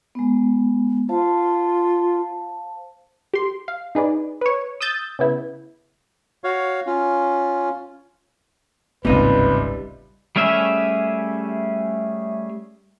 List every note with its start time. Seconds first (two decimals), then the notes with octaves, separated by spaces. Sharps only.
0.15 G#3 B3
1.09 F4 C5 F5 A5
3.34 G4 C6
3.68 F5
3.95 D#4 G#4 B4 D5
4.41 B4 C#5
4.81 D#6 E6 G6 A6
5.19 C#3 B3 E4
6.44 F#4 C#5 F5
6.86 C#4 F4
9.05 D1 G#1 C#2 C3 G3 A#3 D#4 B4
10.36 G3 A3 C#4 G#4 E5